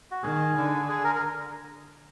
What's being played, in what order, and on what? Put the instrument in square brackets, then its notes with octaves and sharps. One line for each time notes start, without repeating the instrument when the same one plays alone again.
[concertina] F#4
[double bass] D#3 [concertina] G#4
[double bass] D3
[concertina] G#4
A#4
A#4